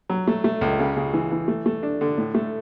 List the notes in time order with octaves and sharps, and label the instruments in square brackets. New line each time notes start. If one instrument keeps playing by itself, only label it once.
[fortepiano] F#3
A3
A3
C#2
C#3
C#3
E3
E3
A3
A3
D4
D3
A2
A3